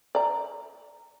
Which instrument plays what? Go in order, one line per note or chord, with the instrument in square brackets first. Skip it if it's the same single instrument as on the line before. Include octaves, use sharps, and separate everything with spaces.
[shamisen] D5 A#5